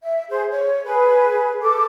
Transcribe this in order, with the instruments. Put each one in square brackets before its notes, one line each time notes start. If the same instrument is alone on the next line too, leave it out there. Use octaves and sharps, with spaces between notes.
[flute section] E5
G#4 C5
C#5
G#4 B4
A4 D6